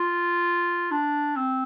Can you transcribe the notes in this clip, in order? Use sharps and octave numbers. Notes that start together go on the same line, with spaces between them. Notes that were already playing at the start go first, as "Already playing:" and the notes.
Already playing: F4
D4
C4